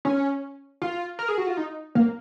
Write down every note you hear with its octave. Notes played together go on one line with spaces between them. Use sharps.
C#4
F4
A#4
G#4
F#4
F4
D#4
A#3